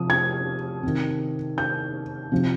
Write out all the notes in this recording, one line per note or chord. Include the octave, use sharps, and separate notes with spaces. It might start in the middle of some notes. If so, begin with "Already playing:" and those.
Already playing: C3 F3 D#6
G#6
C3 D#3
G6
C3 F3